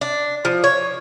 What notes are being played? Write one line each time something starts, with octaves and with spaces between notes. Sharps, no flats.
D4
F3
C#5